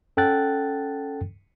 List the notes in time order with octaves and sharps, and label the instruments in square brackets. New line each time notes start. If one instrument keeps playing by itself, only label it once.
[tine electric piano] C#4 A4 F#5 G5 F#6 A6